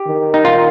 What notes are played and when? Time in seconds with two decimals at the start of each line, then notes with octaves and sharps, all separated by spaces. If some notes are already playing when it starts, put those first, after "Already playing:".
Already playing: G4
0.08 D#3
0.34 D#4
0.45 F4